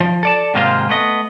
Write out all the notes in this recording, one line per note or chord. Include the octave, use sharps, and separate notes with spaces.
F3
A4 D5 A5
G#2 C3 D#3 A#3 F4 C5
A3 B3 D#5